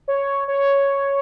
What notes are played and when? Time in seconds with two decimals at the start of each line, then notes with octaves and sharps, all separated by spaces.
0.08 C#5
0.48 C#5